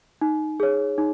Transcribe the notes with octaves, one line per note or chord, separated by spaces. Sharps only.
D#4
G#4 C#5
D#4